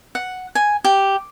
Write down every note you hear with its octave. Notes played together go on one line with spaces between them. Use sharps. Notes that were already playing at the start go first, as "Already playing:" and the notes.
F#5
G#5
G4